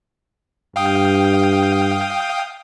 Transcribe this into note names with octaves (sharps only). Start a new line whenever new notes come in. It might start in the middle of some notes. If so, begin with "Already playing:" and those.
G2 F5 G5 D#6